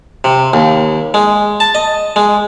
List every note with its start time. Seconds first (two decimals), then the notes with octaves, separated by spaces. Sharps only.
0.24 C3
0.53 D#2
1.14 G#3
1.60 A5
1.75 D#5
2.16 G#3